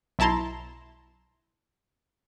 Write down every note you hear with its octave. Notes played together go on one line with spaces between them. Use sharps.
B1 E4 A5 A#5 C6